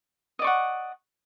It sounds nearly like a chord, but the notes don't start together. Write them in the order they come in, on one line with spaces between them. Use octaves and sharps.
D#5 D5 C#6 F#5